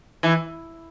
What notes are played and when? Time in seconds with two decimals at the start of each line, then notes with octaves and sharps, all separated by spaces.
0.23 E3